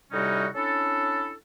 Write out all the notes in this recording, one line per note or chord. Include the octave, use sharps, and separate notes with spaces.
A2 C3 G3 C#4 D#4 F#4
C#4 D4 E4 A4